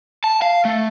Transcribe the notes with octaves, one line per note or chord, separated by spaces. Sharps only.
A5
F5
A3